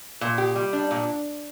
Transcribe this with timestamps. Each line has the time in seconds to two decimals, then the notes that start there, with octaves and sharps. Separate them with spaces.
0.21 A#2
0.38 G4
0.55 G3
0.73 D4
0.91 A#2